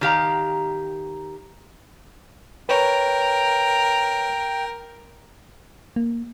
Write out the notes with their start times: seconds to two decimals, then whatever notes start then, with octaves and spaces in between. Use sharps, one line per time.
0.01 D#3 G4 F5 A#5
2.69 A#4 B4 C#5 G5
5.96 A#3